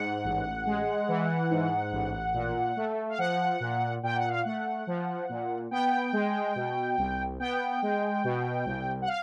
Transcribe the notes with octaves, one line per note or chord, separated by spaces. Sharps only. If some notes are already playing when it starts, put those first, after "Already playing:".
Already playing: G#2 F#5
A1
G#3
E3
G#2
A1
A#2
A3
F5
F3 F#5
A#2
A#2 G5
F#5
F5
A3 F#5
F3
A#2
B3 G5
G#3
B2
C2
B3 G5
G#3
B2
C2
F#5
F5